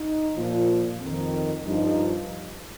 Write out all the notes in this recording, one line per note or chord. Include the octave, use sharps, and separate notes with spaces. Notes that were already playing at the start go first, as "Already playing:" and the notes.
Already playing: D#4
A#2 F3
F2 D#3
G2 F3 D#4